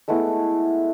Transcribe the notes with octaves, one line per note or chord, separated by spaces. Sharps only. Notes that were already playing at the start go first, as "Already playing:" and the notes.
G#3 A3 B3 E4